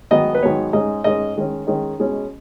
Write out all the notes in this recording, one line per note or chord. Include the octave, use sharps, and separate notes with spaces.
G#2 D#3 F#3 B3 D#5
B4
G#2 D#3 F#3 B3 C#5
G#2 G#3 C#4 D#5
G#2 G#3 C#4 D#5
D#3 G#3 C#4
D#3 G#3 C#4
B2 G#3 C#4